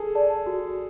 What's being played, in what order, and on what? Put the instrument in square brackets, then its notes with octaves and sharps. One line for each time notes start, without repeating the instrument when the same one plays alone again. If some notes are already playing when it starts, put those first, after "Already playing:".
Already playing: [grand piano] G#4 A4
[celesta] D5 A5
F#4